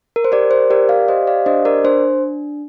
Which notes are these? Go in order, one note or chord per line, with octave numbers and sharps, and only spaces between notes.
A#4
C5
G4 A#4 D5
C5
G4 A#4 D5
D5 F5
G4 C5 D#5
D5 F5
D4 C5 D#5
A#4 D5
D4 C5